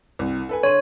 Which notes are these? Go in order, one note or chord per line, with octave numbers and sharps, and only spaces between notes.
C2
A4 B4 G#5
D3 C#5 C6 D#7